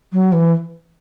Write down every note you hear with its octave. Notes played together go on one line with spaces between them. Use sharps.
F#3
E3